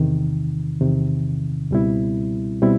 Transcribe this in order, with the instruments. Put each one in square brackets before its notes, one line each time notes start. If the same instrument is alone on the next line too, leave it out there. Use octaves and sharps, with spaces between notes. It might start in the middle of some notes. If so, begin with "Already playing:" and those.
Already playing: [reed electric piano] E2 C3 D#3
E2 C3 D#3
C#2 B2 G3 C4 E4
B2 G3 C4 E4